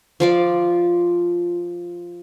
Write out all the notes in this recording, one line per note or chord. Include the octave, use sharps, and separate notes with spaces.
F3 F4 D5